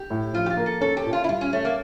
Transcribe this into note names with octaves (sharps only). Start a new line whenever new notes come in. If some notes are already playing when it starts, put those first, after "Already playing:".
Already playing: G4
A2
F3 F4
G4
F4
A#3
A4
C#4 A4
G4
A#2
F4
E4
G3 F4
C#4
A3 C#4
A#3